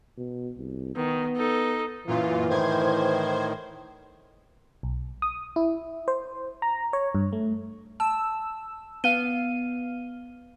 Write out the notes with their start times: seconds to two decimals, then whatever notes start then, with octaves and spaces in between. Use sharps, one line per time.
0.18 B2
0.57 C2
0.96 D#3 B3
1.36 D#4 A4
2.07 F#2 A#2 E3 F4
2.49 A2 D#3 C5 G#6
4.83 B1
5.22 D#6
5.56 E4
6.08 C5
6.62 A#5
6.93 C#5
7.15 G2
7.33 A3
8.00 A5 E6
9.04 B3 F5 D#7 G7